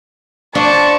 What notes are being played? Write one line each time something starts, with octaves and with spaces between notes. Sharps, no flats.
F3 D4 A5 C#6 D6